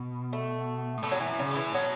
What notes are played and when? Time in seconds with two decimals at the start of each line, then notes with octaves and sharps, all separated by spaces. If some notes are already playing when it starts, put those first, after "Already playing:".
Already playing: B2
0.33 A3
0.97 A2
1.03 B2 A3
1.11 F#3
1.15 A2
1.20 E3
1.27 F#2
1.39 C#3
1.51 A2 E3
1.74 B2 F#3